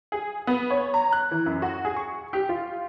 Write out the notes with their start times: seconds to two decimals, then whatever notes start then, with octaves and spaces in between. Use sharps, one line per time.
0.12 G#4
0.47 B3
0.71 C#5
0.94 A#5
1.13 F#6
1.31 E3
1.46 F#2
1.62 F#4
1.85 G#4
1.97 C#6
2.33 G4
2.49 F4